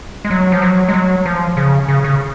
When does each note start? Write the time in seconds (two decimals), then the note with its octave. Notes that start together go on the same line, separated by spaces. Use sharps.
0.25 G#3
0.31 F#3
0.52 F3
0.62 F#3
0.88 G#3
0.94 F#3
1.26 F3
1.57 C#3
1.89 C#3
2.04 C#3